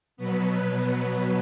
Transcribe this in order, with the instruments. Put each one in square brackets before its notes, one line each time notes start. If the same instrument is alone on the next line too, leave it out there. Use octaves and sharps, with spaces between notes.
[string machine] B2 F#3 B3